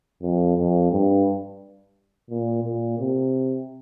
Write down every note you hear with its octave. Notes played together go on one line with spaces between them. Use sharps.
F2
F2
G2
A#2
A#2
C3